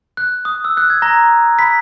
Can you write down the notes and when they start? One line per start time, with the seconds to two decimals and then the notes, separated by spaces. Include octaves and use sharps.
0.17 F#6
0.45 D#6
0.65 E6
0.77 F#6
0.90 G#6
1.02 A#5 A#6
1.59 B5 B6